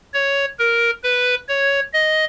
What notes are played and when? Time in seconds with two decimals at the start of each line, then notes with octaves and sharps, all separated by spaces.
0.13 C#5
0.59 A#4
1.04 B4
1.48 C#5
1.93 D#5